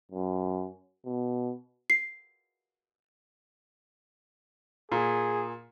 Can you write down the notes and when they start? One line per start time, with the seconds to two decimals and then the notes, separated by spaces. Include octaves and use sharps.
0.12 F#2
1.05 B2
1.90 C7
4.92 A#2 G#4